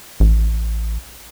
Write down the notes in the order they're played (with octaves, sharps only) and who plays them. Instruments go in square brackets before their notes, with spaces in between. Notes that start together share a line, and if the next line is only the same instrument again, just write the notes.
[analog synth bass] A1